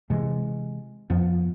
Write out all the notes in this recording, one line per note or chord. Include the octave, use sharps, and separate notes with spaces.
C3 E3 G#3
F2 F3 B3